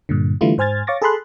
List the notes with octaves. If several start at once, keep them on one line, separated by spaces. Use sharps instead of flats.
G2 A#2 D3
D3 E3 G3 A3 E4 F4
G#2 C5 G#5 F6 G#6 A6
C#5 F5 C#6 D6 A6 A#6
G#4 A4 A5 B5 C6 F#6